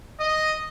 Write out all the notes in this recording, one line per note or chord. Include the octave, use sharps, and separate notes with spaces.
D#5